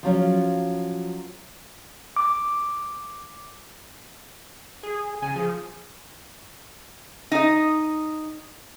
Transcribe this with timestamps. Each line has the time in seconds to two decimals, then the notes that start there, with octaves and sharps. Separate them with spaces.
0.03 F3 F#3 C#4 F4
2.16 D6
4.83 G#4
5.22 C#3 G#5
5.36 F3 G#4
7.31 D#4 D#5